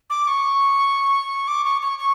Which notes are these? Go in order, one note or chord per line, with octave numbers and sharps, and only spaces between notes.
D6
C#6
D6
C#6
C#6
C#6